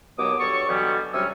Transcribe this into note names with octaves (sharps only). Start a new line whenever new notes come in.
D#2 B2 F#3 B3 D6 D#6
G2 F#3 A4 C#5 C#6
B2 D3 E3 F#3 G3 B3
D2 C3 F#3 G3 C#4 E6